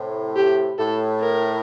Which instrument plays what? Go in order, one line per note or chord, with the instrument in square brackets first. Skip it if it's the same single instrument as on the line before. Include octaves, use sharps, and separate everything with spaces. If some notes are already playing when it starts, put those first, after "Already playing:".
Already playing: [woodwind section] A2 C3
[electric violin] G4
[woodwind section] A2 [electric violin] A4
[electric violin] A#4